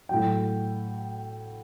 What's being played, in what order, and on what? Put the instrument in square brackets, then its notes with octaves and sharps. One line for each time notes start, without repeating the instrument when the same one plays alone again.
[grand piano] A2 F#3 G5